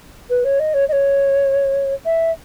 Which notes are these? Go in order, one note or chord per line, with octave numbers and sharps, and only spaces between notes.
B4
C#5
D#5
C#5
D#5
C#5
E5